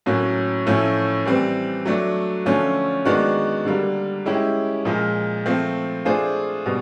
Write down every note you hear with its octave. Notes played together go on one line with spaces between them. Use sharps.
A2 F#3 A#3 C#4 F#4
A2 F3 A3 C#4 E4
E3 G3 C4
F#3 A3 D4
D3 F3 A3 C#4 F4
D#3 G#3 B3 D4 F#4
D3 G3 A#3
G#3 C#4 E4 G4
A#2 F3 G#3
F3 A3 C4
A3 D4 F4 G#4 C5
B2 G3